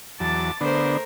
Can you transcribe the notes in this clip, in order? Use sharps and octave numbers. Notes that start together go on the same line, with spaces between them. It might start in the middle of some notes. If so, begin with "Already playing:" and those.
E2 F#3 A5 D6 A6
D3 A3 B3 D4 A#4 C5